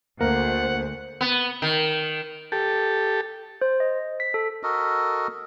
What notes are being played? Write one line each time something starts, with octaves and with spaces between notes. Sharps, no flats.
D2 A#3 A#4 C5 F#5
B3
D#3
G4 A4
C5
D#5
B6
A4
F#4 A4 A#4 D#5